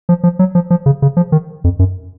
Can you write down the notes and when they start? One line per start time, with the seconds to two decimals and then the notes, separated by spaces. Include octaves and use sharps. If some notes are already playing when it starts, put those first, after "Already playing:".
0.09 F3
0.23 F3
0.39 F#3
0.55 F3
0.70 F3
0.86 C#3
1.02 C#3
1.17 F3
1.32 D#3
1.64 F2
1.79 F#2